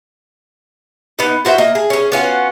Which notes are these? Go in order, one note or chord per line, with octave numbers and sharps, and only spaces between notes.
B3 D#4
F4 F#4 C5 E5
A#3 D#5
G#4
C#4 G#4
B3 C#4 F4 F#4